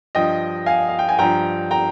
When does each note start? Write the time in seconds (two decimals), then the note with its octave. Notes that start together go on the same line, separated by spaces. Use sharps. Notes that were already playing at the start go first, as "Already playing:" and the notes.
0.15 G2 F3 D#5 G5
0.66 F5 G#5
0.89 F5
0.99 G5
1.09 G#5
1.19 G2 F3 G5 A#5
1.71 G5 A#5